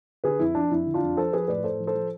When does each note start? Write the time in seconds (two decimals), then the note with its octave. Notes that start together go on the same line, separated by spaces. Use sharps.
0.24 D3 G#4 B4
0.39 F2 E4
0.55 F3 D4
0.71 F2 E4
0.86 D3
0.94 D4 F4
1.02 F2
1.17 F3 A4 C5
1.33 F3 G#4 B4
1.48 A2 B4 D5
1.64 A2 A4 C5
1.80 F3
1.87 A4 C5
1.95 F3